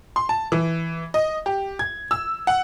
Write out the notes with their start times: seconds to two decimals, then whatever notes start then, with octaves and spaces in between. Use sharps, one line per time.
0.16 C6
0.29 A5
0.52 E3
1.14 D#5
1.46 G4
1.79 G#6
2.11 E6
2.47 F#5